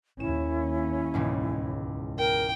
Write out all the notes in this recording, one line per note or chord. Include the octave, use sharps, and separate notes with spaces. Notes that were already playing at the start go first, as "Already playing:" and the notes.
D#2 C#4 E4 E7
E1 C#2 G#2
A#4 G5